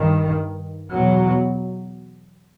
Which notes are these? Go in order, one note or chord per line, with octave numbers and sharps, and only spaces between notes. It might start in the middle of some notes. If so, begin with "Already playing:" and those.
Already playing: G2 D#3
E2 B2 F#3